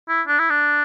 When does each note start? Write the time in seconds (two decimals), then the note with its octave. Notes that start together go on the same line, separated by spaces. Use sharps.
0.09 E4
0.28 D4
0.39 E4
0.50 D4